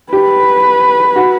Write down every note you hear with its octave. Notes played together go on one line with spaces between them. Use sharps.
G4 B4
F#4